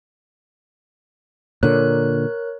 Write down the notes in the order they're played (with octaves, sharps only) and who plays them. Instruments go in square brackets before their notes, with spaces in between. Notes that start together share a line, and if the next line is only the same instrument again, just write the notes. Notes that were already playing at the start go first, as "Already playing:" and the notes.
[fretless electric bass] A#2 D3 [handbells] A#4 C#5 F#6